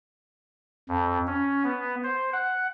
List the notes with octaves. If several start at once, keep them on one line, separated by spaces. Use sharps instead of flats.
F2
C#4
B3
C5
F#5